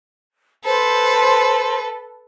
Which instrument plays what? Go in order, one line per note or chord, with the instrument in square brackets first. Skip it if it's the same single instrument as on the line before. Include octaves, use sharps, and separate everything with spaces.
[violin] A4 B4 [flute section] C5